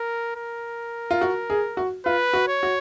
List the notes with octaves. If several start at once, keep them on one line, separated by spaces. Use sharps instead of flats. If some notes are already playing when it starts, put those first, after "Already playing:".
Already playing: A#4
A#4
F4
F#4
G#4
F#4
F4 B4
F#4
C#5
F#4